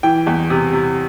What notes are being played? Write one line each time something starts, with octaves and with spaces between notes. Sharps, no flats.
E3 G5
E2
C3
C3